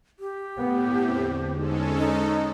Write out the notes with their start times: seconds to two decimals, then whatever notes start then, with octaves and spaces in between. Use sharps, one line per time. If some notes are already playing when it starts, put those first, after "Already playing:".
0.19 G4
0.57 A2 B3
1.08 E2 D3 C4
1.56 G#2 G#3 C#4 A4
1.98 D#4